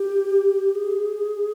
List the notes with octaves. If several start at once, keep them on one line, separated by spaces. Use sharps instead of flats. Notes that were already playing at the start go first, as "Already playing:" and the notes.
Already playing: G4
G#4